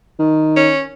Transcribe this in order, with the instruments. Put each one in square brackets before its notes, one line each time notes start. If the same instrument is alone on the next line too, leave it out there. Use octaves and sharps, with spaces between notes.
[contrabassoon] D#3
[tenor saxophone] C#4